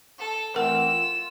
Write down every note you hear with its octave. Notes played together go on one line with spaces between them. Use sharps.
A4
E3 A3 C4 A#4 F#5 E6
F4